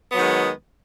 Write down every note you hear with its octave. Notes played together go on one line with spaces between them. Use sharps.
D#3 F#3 G#3 B3